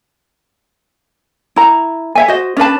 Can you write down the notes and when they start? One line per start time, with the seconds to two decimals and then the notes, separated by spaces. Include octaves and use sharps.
1.56 E4 A#5
2.15 C#5 E5 G#5
2.28 F#4 C5 D#5
2.57 C#4 D4 B4 A5